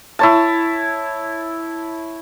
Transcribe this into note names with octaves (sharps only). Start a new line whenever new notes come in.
E4 C#5 A5